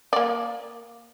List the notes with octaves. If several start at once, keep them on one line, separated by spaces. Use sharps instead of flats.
A#3 D5